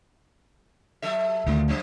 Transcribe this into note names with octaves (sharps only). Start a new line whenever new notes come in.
F#3 A4 E5
D2 D#3 A3 A#3 F4
D3 F3 F#3